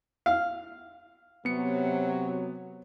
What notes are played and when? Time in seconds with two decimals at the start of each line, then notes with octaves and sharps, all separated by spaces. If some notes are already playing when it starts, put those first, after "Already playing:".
0.26 F5
1.45 C3 F#3 B3 C#7